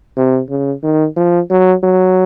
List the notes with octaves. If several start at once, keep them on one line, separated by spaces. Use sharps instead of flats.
C3
C#3
D#3
F3
F#3
F#3